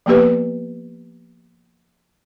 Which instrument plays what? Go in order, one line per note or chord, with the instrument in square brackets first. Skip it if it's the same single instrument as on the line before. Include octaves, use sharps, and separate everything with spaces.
[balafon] F3 A#3 B3 G4 B4